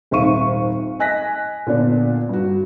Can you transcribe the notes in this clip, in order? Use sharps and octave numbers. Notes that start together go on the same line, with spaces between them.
D#1 G#1 E5 F5 C#6 D#7
D#5 G#5 F#6 A#6 B6
A#2 D3 B3 D4
G2 F#4